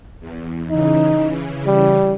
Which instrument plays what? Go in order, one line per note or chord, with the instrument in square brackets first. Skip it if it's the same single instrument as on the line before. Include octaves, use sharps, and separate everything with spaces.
[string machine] E2
[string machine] C#3 E3 [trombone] D#4
[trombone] G3